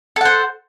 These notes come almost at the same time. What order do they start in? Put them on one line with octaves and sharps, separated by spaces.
A4 F#5 C5